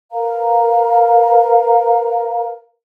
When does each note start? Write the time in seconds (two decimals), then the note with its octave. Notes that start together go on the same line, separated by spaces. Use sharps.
0.12 A#4 B4 F5 A#5